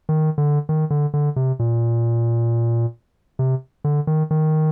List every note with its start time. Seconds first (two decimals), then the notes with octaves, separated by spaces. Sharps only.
0.09 D#3
0.38 D3
0.69 D#3
0.90 D3
1.14 D3
1.36 C3
1.59 A#2
3.39 C3
3.84 D3
4.07 D#3
4.31 D#3